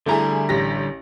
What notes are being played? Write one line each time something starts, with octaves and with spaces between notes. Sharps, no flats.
D3 G3 A3 E4 G#4 A#5
A1 G4 A#6